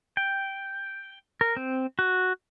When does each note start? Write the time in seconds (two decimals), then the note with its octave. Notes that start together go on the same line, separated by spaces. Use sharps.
0.17 G5
1.41 A#4
1.57 C4
1.99 F#4